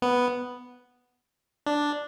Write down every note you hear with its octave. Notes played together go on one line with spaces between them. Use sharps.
B3
D4